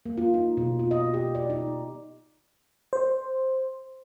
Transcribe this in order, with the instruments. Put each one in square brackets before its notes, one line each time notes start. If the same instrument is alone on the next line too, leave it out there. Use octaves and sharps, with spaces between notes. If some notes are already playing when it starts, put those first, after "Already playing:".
[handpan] A#3
F4
D#4
B2
F4
D#5
G4
D5
D#4
[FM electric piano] C5